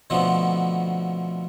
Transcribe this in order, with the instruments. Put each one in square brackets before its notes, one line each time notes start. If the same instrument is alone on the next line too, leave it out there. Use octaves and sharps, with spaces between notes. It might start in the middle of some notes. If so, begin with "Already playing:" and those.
[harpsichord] B2 D3 F3 A3 B3 C4